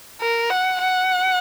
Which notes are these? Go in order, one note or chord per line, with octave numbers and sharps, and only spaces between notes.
A#4
F#5
F#5